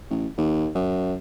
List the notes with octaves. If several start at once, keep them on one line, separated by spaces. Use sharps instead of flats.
A1
D#2
F#2